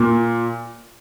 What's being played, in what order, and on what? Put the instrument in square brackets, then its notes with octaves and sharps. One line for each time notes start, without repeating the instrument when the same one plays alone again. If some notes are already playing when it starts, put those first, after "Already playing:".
Already playing: [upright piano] A#2